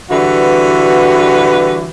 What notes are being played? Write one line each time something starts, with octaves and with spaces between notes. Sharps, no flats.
D3 E3 G3 F#4 B4